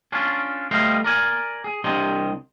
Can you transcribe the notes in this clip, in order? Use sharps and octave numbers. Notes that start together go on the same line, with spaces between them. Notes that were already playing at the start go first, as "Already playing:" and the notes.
C#4 D4 F4
G3 A3 B4 C5 D#5 F5
A#4 D5 G#5
G#4
C2 D4 G4 C5 D#5